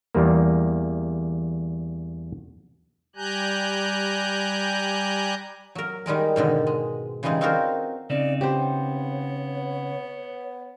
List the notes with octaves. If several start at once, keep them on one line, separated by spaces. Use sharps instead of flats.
E2 G3 A#3
G3 G4 G#5 A#5 F#6 G6
F#3 A#4
D#3 G3 G#3 A#4
G#2 B2 D3 D#3
G#3
C#3 E3 G3 G#3 D#4
C4 D#4 F4 F#4 A#4 C5
C#3 C4 D#4 D5
B3 G4 C5 C#5